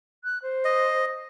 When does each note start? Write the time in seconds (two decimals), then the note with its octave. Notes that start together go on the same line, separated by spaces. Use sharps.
0.24 F#6
0.42 C5
0.65 D#5